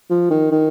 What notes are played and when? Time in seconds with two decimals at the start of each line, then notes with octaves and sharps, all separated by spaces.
0.10 F3
0.30 D#3
0.51 D#3